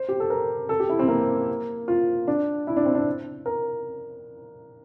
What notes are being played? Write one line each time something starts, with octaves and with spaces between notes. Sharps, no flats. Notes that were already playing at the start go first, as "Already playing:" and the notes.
Already playing: C5
G4
A4
A#4
A4
G4
E4
C4
A#3
F4
D4
E4
D4
C4
D4
A#4